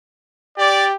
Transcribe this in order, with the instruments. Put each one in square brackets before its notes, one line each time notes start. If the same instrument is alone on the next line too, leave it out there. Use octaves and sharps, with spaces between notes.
[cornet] G4 [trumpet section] D5